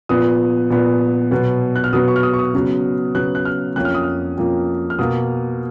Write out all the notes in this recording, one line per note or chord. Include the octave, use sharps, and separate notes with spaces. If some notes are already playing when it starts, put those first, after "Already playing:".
A#2 F3 B3 D#6
A#2 F3 B3
B2 F#3 B3
F#6
F6
B2 F#3 B3 D#6
C#6
F6
D#6
C#6
D#6
C#3 F#3 B3
C#3 F#3 B3 F#6
F#6
F6
F2 F3 A#3 C#4 F#6
F6
D#6
F6
F2 F3 A#3 C#4
F6
B2 A#3 D#6